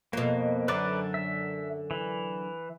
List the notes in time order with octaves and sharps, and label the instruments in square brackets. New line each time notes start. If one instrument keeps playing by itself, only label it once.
[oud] F2 B2 [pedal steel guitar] A#3
[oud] F#2 D3 [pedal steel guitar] B4 D5 D6
[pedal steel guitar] E5
E3